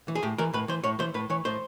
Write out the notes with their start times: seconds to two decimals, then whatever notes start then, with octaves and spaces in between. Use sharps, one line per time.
0.08 E3
0.15 G#4
0.23 A2 G4
0.38 E3 A#4
0.53 A2 B4
0.68 E3 C5
0.84 A2 C#5
0.99 E3 C5
1.14 A2 B4
1.30 E3 C#5
1.45 A2 C5